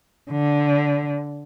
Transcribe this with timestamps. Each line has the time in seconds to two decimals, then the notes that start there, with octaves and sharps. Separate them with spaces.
0.31 D3